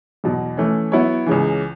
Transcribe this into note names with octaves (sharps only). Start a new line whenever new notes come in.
E2 B2 F#3
E3 A3 C#4
F#3 B3 E4 C#5
C#2 C#3 E3